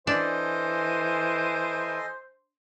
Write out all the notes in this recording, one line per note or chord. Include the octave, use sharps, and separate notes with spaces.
E3 D4 A4 C5 D#5 G#5